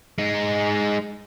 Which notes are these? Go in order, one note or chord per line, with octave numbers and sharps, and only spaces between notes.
G#3 D#4